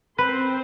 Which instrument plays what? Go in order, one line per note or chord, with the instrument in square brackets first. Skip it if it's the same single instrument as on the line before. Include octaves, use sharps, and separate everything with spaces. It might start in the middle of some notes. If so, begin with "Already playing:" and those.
[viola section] C4 C5 [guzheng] B4